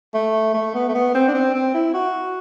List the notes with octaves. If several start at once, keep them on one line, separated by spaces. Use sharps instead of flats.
A3
A3
B3
A3
B3
C4
D4
C4
C4
E4
F#4